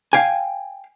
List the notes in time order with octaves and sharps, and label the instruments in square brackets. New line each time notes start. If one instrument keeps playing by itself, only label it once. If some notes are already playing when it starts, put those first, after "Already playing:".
[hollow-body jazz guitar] F5 G5 G#5